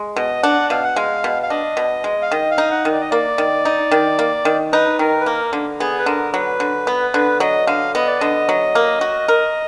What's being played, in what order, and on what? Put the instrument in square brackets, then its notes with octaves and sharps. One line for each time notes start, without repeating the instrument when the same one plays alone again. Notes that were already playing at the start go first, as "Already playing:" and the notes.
Already playing: [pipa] G#3
[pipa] B2 [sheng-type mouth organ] D#5
[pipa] D4 [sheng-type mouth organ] F#5
[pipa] B2 [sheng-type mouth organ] F5
[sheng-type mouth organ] F#5
[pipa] G#3 [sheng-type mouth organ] F5
[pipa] B2
[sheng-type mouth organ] F5
[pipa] D4 [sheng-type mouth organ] D#5
[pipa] B2
G#3
[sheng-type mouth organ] F5
[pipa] D#3 [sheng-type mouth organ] D#5
[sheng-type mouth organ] F5
[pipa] D#4
[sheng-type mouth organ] F#5
[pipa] D#3
[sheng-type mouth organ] D5
D#5
[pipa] A#3 [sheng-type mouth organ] D5
[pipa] D#3
D#4
D#3
A#3
D#3
[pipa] D#4 [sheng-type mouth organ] B4
[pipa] D#3 [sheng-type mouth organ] A#4
[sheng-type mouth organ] B4
[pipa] A#3 [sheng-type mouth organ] A#4
[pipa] D3
[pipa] B3 [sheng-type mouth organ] G#4
[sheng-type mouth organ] B4
[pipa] D3 [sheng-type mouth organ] A#4
[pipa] F#3 [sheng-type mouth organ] B4
[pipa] D3
B3
[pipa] D3 [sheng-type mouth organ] B4
[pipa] F#3 [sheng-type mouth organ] D#5
[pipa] D3 [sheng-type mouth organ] F5
[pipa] B3 [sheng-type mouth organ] D#5
[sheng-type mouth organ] D5
[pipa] D3 [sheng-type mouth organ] D#5
[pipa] F#3
A#3
F#4
A#4